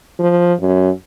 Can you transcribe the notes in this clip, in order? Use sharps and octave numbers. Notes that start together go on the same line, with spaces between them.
F3
F#2